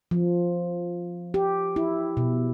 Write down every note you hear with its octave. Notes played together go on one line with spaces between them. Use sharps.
F3
G4
E4
B2